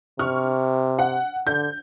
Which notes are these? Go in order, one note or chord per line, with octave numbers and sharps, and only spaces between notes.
C3 C#6 F6
F#5
D3 G6